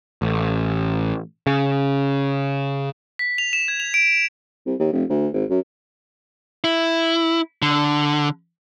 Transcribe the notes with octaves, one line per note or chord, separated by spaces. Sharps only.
A1
C#3
B6
F7
E7
G#6
F7
D7
C2
D#2
F1
D2
G#1
F#2
E4
D3